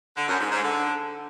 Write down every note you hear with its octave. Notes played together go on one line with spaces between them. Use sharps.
D3
F#2
G#2
G#2
D3